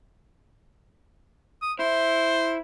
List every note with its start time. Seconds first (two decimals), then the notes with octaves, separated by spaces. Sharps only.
1.62 D#6
1.79 E4 C5